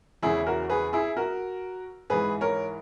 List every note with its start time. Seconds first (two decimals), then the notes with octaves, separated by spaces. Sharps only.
0.23 E2 C#3 E3 E4 G#4
0.46 F#4 A#4
0.70 G#4 B4
0.93 E4 G#4
1.17 F#4 A#4
2.10 G#2 E3 G#4 B4
2.41 A#4 C#5